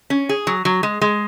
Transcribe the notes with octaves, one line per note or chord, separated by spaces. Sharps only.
C#4
G#4
F#3
F#3
G#3
G#3